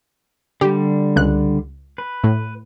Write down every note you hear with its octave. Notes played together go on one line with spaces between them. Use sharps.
D3 G3 G4
C#2 F#6
B4
A2